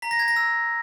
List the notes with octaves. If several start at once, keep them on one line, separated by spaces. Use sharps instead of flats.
A#5 B6
A#6
G#6
A#6
E6